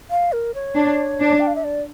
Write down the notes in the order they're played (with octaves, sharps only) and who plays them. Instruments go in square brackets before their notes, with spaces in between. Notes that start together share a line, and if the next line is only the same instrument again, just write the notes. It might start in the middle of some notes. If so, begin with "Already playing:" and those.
[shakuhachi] F5
A#4
C#5
[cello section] D4
D4
[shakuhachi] G5
F5
E5
D5